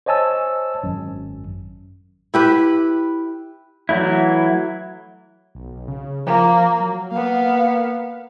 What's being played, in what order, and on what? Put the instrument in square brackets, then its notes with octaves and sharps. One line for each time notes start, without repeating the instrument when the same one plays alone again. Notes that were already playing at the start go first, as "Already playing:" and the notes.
[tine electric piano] C5 C#5 D#5 G#5 A5 E6
G#1 F#2
[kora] E4 G4 B4
[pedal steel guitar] E3 F#3 A3 E4
[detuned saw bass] B1
C#3
[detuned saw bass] F3 [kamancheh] A#3
[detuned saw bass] F#3
[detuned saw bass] A#3 [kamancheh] B3 F5